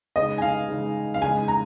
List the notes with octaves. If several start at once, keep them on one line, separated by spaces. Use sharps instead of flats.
C#3 G#3 D#4 D#5
G#5
F5
C#3 G#3 D#4
F5
C#3 G#3 D#4 G#5
A#5